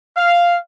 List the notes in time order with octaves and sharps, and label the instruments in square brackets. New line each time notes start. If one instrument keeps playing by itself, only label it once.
[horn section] F5